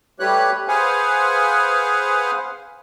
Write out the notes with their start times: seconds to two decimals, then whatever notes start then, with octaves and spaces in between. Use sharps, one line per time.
0.20 G3 A3 G4 B4 C#5 F#6
0.68 G#4 B4 C5 F5 F#5 G#5